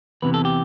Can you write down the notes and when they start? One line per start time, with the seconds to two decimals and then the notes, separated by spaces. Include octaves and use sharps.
0.22 E2 C3 E3 B4
0.34 A4
0.45 G4